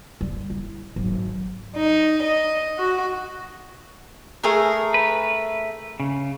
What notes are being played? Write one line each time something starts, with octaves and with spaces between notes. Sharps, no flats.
G3
E4
G#1 F#3
D#4
D#5
F#4
A3 G#4 A#4
B4
C#3